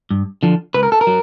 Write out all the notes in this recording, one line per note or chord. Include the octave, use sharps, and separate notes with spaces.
G2
D3 F3
C#2 B4
A#4
A4
A#4
F#3